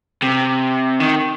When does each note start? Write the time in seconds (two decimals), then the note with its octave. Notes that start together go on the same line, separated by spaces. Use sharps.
0.23 C3
1.00 D#3